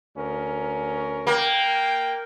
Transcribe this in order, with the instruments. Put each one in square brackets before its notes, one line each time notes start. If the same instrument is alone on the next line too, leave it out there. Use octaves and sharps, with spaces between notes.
[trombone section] D2 C#4 A#4
[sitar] A#3 [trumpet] G5